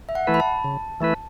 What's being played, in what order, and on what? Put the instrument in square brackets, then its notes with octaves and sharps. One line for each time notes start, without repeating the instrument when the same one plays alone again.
[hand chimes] E5
F#5
[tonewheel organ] E3 A3 E4 B4
[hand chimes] B5
A5
[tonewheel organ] C#3
E3 A3 E4 B4